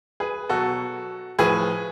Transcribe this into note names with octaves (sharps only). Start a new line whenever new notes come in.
G#4 B4
B2 F#3 F#4 A4
A2 F3 G#4 B4